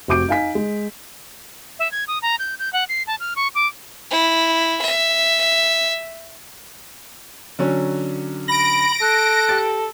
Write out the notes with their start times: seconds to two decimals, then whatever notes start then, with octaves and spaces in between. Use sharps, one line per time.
0.08 F1 C4 F#4 D6 G6 D7
0.29 D#4 F5 G#5 B6
0.55 G#3
1.79 E5
1.92 G#6
2.08 D#6
2.22 A#5
2.39 G6
2.59 G6
2.73 F#5
2.89 C7
3.07 A5
3.20 F6
3.36 C#6
3.55 D6
4.11 E4
4.82 E5
7.59 D3 F#3 C#4
8.48 B5 A#6 D7
9.01 A4 F#6
9.49 G4 A6